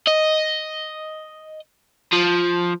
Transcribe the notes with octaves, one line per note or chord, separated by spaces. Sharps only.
D#5
F3